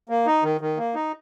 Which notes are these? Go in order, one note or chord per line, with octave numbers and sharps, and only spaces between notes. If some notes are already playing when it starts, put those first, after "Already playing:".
A#3
D#4
D#3
D#3
A#3
D#4